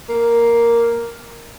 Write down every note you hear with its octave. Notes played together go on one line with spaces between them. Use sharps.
A#3